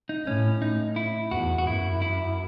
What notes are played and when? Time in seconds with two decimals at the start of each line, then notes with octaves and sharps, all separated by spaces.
0.09 D#4
0.27 A2 C#4
0.62 D#4
0.96 E4
1.31 E2 F#4
1.58 F#4
1.67 F#2 E4
2.02 E4